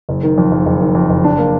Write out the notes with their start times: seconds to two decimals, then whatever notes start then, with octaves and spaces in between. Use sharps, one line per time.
0.09 F#1
0.23 D#3
0.38 F2
0.52 F#1
0.66 F#1
0.80 D#3
0.95 F2
1.10 F#1
1.24 D4
1.38 A#3